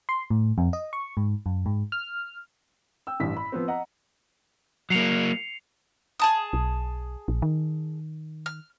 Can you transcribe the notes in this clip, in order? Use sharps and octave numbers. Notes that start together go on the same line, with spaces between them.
C6
A2
F2
D#5
C#6
G#2
F#2
G#2
F6
G5 E6
A1 G2 B6
B5
F3 B3 C4
D#5 F#5 A#5
F#3 A#3 C7 C#7 F7
G#4 A5 D#6
B1
A#1
D#3
F6